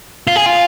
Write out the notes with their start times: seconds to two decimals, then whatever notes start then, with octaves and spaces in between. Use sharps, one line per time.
0.27 F4
0.36 G#4
0.46 F4